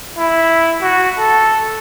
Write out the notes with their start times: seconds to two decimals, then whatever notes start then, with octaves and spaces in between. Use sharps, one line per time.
0.18 E4
0.82 F#4
1.19 A4